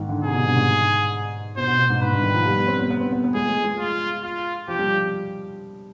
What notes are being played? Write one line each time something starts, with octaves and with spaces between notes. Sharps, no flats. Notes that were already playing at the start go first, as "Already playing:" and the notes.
Already playing: G#2 D#3
D3
C3 G#4
B2
G2
G#2
B2 C5
B2
B2
G#2
G#2 B4
G2
D#3
F3
G3
B3
C4
B3
B3
C4
B3
B3
G#3 G#4
G#3
G#3
F4
F4
F3 G4
G3